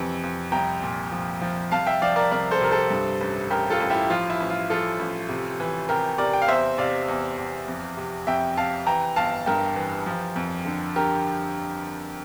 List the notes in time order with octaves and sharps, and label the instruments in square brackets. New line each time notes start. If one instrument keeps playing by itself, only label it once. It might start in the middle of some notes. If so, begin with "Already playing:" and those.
Already playing: [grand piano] F2 C3 E3
F2
C2 G5 A#5
A#2
F3
F3
C2 F5 A5
E5 G5
F3 D5 F5
A#4 D5
C2 A#4 D5
A4 C5
C3 A#4
A4 C5
G2
A1
A1 G4 A#4
F4 A4
A1
E4 G4
F3 F4
E4
A1
F4
F3 F4 A4
A1
C3
E3
C3 G4 A#4
C3 A#4 D5
G5
F5
E2 C5 E5
C3 D5 F5
E2
E2
F2
C3
F2 E5 G5
C3 F5 A5
E3 G5 A#5
G1 F5 A5
G2 G4 A#4
E3
F3
F2
D3
D3 G4 A#4